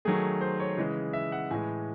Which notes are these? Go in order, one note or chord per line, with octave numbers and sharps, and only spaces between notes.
D#3 F#3 A3 G#4
C5
C#5
C#3 E3 G#3
E5
F#5
A2 E3 G#3 G#5